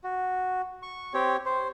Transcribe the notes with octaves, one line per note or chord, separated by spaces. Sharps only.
F#4
C#6
C4 G4 C#5
C5